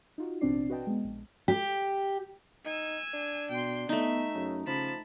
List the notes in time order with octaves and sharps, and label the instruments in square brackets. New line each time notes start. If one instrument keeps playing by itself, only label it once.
[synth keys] D#4 F4 F#4
A1 B2 C4 D4 D5 C7
F#4 B4 D#5 G5 A5
G#3 B3
A#1
[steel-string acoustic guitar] G4
[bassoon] D#4 [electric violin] G#5 E6
[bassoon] D4
[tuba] B2 [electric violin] G5 C6
[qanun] A3 D#4 [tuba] B3 [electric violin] E5
[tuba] F#2 [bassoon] C#3
[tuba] C#3 [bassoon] F3 [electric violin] A5 B5